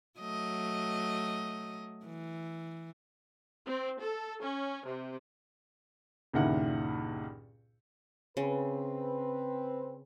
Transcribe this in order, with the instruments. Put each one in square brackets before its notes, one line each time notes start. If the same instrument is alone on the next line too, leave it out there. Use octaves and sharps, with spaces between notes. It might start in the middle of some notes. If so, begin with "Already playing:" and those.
[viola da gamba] F#3 A3 D#5
E3
[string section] C4
A4
C#4
C3
[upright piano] C#2 G2 A#2 D#3 E4 F#5
[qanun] C#3 [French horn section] C4 B4